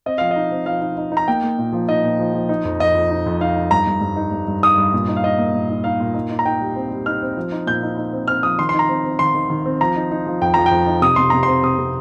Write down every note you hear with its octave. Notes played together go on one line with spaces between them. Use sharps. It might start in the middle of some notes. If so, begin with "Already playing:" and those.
C4 D#5
F3 F5
D#5
D#4
C4
F3 F5
D#4
D#4
D#4
A#5
A#3 G5
A#3
A#2
F3
D#4 D#5
A#2
F3
F3
D#4
F2
F2 D#5
F2
D#4
F2
D#4 F5
D#4
G2 A#5
G2
G2
D#4
G2
G2
D#4 D#6
G2
A#2
D#4
F5
D#4 D#5
A#3
A#2
D#4
D#4 F5
A#2
D#4
D#4
A#5
D#4 G5
G3
C4
G3
D#4 F6
C4
F3
D#4
A#2 G6
D#4
D#4
C4
C4 F6
F3 D#6
D#3 C6
C6
D#4
A#5
C4
C4
D#3 C6
D#3
D#3
C4
F3 A#5
D#4
D#4
F3
F2 G5
F3 A#5
G5
F2
D#4
C3 D#6
C3 C6
C3 A#5
C4 C6
C3 D#6
C3